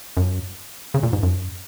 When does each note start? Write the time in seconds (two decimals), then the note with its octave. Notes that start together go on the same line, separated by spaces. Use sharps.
0.17 F#2
0.94 C#3
1.03 A#2
1.13 G#2
1.23 F#2